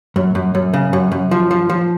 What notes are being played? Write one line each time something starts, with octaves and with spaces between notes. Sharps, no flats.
F#2
F#2
F#2
C#3
F#2
F#2
F3
F3
F3